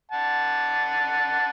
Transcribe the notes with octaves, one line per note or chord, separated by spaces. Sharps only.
F#5 A5